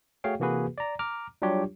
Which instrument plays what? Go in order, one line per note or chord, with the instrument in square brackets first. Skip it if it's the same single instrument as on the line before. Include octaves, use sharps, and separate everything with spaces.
[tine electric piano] A3 F#4 G#4 C#5 F5 G5
C3 E3 A#3 F#4 G#4 B4
D5 A#5
A#5 D6 F6
F#3 G3 D4 F4 G4 C#5